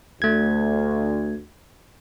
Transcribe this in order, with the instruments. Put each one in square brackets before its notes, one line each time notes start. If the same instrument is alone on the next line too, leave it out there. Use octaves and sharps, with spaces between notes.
[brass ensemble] D2 [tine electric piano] A3 G#6